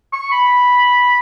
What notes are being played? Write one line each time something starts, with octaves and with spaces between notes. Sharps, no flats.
C#6
B5